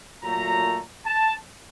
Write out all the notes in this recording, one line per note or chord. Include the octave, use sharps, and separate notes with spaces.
A#2 F#3 A3 A#5
A5